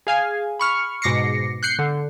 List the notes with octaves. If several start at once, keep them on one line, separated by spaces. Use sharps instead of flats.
G#4 F5 G#5
B5 C#6 F6
G#2 B2 D6 A#6 C7 C#7
F#6 G6 C7 C#7
D3